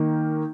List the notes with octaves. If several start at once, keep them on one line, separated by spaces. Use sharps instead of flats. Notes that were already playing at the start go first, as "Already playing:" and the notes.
Already playing: D#3 A#3 D#4